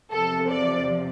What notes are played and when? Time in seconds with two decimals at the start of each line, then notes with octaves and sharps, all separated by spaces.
0.11 E2 C3 F3 A4
0.51 D5